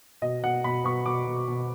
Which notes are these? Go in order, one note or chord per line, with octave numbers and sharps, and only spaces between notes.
B2 D#5
B2 F#5
B2 B5
B2 C#6
B2 D6
B2
B2